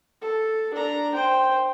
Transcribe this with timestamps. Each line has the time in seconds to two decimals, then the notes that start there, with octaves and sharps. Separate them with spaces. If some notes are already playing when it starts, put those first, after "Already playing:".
0.22 A4
0.74 D4 A#5
1.15 C5 G5